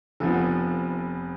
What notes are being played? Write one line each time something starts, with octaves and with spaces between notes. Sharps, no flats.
F1 F2 F3 B3 A4